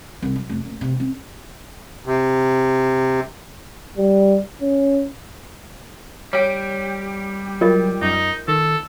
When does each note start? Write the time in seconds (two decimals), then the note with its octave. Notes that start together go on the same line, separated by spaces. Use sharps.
0.22 C2
0.36 F#3
0.49 F1
0.64 D#1
0.81 C3
1.00 C4
2.06 C3
3.97 G3
4.61 C#4
6.33 G3 G4 C#5
7.61 F#3 F4 A#4 D#5
8.02 F#2 D#4
8.48 D#3 A4